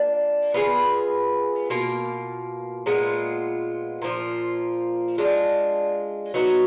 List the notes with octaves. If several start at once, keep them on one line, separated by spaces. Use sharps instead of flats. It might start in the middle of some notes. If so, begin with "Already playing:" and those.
Already playing: A#3 D4 F4
B3 F4 G#4 B4
B2 A#3 F4
A#2 G#3 B3 F4
A#2 F3 A#3 F4
G#3 D4 F4
F#3 B3 D#4 F#4